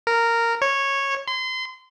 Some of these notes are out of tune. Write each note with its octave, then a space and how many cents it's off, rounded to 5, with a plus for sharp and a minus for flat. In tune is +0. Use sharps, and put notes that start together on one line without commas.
A#4 -10
C#5 -10
C6 -30